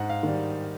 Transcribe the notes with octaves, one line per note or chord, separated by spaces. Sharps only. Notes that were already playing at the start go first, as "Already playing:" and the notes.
Already playing: G#2 F#5
F5
D#3 G3